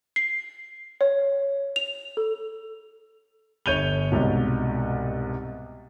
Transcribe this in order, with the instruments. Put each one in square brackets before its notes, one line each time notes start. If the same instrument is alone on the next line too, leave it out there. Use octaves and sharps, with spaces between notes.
[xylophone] C7
C#5
F7
A4
[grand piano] G1 C#5 G6 D#7 F7 G7
C2 G#2 B2